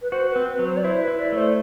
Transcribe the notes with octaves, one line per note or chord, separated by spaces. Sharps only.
B4
F#4 C5
B4
C4
B4
F#3
C5
D5
E4 C5
B4
E4
D5
A3 C5